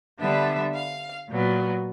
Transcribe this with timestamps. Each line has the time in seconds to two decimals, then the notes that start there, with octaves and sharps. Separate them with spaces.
0.19 D3 G3 B3 D4 E5
0.74 F5
1.30 A#2 F#3 B3